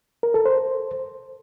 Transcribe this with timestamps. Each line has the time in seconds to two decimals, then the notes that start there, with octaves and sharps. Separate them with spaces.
0.23 A#4
0.34 A4
0.45 C5